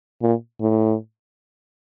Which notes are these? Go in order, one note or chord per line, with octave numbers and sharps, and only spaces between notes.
A#2
A2